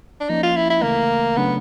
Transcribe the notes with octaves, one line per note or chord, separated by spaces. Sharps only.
D4
F3 A#3 C#4 D#4
F4
E4
E4
D2 C#3 E3 A3 A#3
C#3 F#3 A3 B3 D4